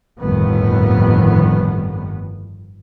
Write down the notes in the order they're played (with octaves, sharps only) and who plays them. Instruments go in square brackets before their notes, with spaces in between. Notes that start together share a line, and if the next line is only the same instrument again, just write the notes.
[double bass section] G1 F2 A2 D#3 G3 B3